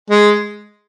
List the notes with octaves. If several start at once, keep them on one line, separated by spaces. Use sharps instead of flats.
G#3